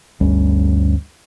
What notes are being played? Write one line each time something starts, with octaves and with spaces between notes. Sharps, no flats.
G1 D2 G3 C#4